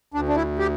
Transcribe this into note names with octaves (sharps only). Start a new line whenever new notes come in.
D2 D4
D4
E4
G4